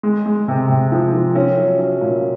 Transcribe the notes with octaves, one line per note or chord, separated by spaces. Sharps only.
G#3
G#3
C3
C3
F3
F3
C#4
F#3
C#4
A#2